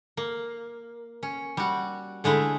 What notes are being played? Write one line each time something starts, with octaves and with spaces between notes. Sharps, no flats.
A#3
C#4
G3 F#4
D3 G#3 A3 E4